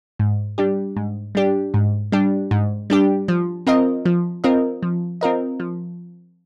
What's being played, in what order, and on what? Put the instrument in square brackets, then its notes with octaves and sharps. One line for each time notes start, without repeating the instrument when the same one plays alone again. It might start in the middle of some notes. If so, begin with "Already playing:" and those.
[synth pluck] G#2
G3 D4 G4
G#2
G3 D4 G4
G#2
G3 D4 G4
G#2
G3 D4 G4
F3
C4 F4 A#4 D#5
F3
C4 F4 A#4 D#5
F3
C4 F4 A#4 D#5
F3